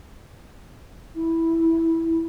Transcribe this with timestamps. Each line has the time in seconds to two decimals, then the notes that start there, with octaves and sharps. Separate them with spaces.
1.15 E4